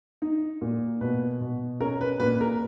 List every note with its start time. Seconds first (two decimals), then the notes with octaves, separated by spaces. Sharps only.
0.22 D#4
0.61 A#2
1.01 B2 B4
1.41 B2
1.80 C#4 A#4
2.01 B4
2.20 A#2 B4
2.41 A#4